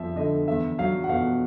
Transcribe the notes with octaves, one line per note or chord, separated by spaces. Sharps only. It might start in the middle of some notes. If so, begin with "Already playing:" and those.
Already playing: F2 F3 E5
D3 D#5
E2 E5
F#3 F5
F#5
B2 F5